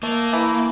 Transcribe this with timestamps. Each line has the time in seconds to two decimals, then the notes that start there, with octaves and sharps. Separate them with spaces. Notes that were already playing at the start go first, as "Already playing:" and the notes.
0.03 A3 A#3
0.33 E3